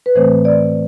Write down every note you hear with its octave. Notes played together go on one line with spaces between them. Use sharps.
B4
A2 E3 A3 C4 C5
D5